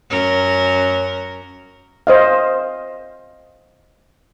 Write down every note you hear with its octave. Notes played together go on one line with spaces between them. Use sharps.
F#2 C#4 A#4
C5 D#5 F5